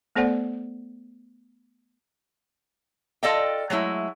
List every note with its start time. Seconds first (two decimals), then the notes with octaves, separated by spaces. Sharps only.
0.16 A3 B3 A4 C5 D5 F#5
3.23 F4 A4 D5 D#5 F5 G5
3.70 F#3 G#3 A3 E4